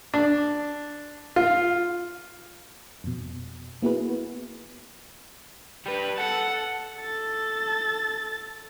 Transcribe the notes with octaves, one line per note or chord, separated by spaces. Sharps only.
D4
F4
F2 B2
A#3 B3 E4 F#4 G#4 B4
G3 B4
A4 F#5 A5
A4 A6